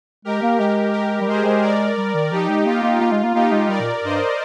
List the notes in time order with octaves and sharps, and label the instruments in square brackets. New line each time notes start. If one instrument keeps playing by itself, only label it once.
[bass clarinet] G#3 [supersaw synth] G4 A#4
[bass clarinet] A#3
[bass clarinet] G#3 [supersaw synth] G4 A#4
[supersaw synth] G4 A#4
[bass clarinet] G3
[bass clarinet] G#3 [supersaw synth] G#4 C5
[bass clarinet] G#3
[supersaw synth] A#4 D5
[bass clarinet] G3
D#3
[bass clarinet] F3 [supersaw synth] D#4 G4
[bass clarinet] G#3
[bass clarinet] A#3 [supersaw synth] F4
[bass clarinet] A#3
[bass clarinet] A#3 [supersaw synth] F4
[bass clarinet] G#3
A#3
[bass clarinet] A#3 [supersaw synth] D#4 G4
[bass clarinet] G#3
[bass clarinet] G3 [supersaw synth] A#4 D5
[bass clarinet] A#2
[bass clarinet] G2 [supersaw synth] C5 D#5